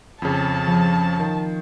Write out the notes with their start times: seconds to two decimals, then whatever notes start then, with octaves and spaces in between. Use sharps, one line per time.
0.22 F2 C#3 A5
0.66 F3 C4 D#6
1.20 D#3